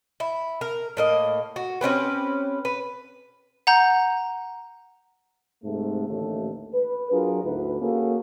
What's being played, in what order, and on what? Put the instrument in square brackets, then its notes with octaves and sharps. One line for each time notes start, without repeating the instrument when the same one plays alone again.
[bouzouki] E4
A#4
A2 A#3 D#5
F#4
C4 C#4 G4 B4
B4
[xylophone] F#5 A#5 G6
[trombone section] G#2 C3 A3
A1 D#2 D3 A3
B4
F#3 D4 F4 G#4 A#4
D2 G#2 E4 B4
A#3 C#4 F#4 G#4 A4